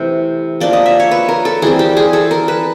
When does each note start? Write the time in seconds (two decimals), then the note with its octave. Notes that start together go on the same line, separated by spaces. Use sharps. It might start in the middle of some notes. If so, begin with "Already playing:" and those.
Already playing: C3 E3 A3
0.60 F3 A#3 D4 D5
0.73 D#5
0.86 E5
1.00 C#5
1.11 B4
1.28 A#4
1.45 A4
1.62 E3 G3 C4 G#4
1.79 G4
1.97 G#4
2.13 A4
2.31 A#4
2.48 B4